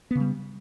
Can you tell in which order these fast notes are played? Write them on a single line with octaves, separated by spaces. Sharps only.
B3 C#3 G3